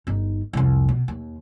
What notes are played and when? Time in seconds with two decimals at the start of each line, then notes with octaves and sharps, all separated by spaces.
0.07 G1 D#4
0.53 C2 F2
0.89 B2
1.08 D#2